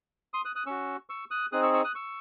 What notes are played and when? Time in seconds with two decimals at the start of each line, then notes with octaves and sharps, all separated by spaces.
0.34 C6 D#6
0.45 D#6 F#6
0.55 D#6 F#6
0.66 C#4 F#4 C#6 E6
1.10 C#6 E6
1.31 D#6 F#6
1.52 C4 D#4 G#4 D#6 F#6
1.63 C#6 E6
1.73 C#6 E6
1.84 D#6 F#6
1.95 C#6 E6